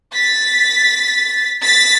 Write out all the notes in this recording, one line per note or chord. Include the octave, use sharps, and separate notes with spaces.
A6 B6
A6 B6